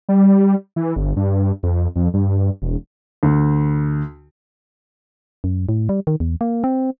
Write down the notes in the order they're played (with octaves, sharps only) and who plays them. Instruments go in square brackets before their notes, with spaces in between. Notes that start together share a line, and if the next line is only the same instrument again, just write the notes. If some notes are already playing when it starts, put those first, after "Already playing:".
[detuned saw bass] G3
E3
G1
G2
F2
F2
G2
E1
[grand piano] D2
[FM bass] F#2
A2
G3
D#3
E2
A#3
C4